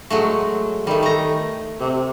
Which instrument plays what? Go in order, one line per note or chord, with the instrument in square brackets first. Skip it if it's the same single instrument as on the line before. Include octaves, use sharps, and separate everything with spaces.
[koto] F#3 G#3 A3
[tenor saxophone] D#3 [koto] G3 A3
[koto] A3 A#5
[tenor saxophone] C3